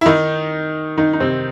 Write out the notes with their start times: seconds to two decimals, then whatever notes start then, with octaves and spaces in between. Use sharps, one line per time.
0.01 E4
0.06 D#3 D#4
0.97 D#3 D#4
1.13 D#4
1.20 C3 C4